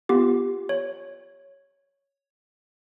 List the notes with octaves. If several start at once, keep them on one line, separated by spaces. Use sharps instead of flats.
B3 F4 G4
C#5